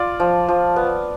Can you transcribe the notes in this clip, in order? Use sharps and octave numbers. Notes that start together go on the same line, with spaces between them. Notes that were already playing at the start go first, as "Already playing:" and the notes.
Already playing: F4 D5
F3
F3
B3